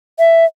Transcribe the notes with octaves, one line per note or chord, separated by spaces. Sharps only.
E5